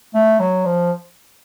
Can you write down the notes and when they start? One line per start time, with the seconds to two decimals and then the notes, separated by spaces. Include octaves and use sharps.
0.14 A3
0.40 F#3
0.65 F3